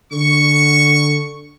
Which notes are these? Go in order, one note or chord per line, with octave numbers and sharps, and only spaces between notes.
D3 C#6